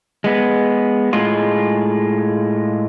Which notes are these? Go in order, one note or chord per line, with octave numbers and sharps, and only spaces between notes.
G#3 B3
A2 G#3 F4